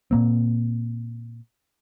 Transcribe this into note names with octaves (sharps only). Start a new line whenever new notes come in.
A#2 A#3 C4